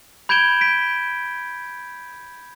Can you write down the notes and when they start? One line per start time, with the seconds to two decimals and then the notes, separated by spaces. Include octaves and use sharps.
0.29 B5 G6 G#6 D7 E7 G7
0.61 B6 D7